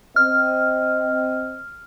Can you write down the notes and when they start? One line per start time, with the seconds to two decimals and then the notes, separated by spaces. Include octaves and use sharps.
0.16 C4 D#5 F6